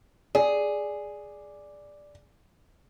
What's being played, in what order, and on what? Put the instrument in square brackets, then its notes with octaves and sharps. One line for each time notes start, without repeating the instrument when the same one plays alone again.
[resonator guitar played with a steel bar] G#4 [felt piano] D5